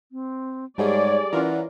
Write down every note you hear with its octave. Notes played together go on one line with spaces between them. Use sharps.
C4
G#2 G3 A3 G#4 C#5 D5
E3 C#4 F4 A#4 F#5